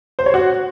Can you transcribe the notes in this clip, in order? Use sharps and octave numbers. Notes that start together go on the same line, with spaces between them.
C5
C#5
F#4